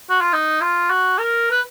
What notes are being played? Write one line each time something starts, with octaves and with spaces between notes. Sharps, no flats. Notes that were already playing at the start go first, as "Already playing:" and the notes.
F#4
F4
D#4
F4
F#4
A#4
B4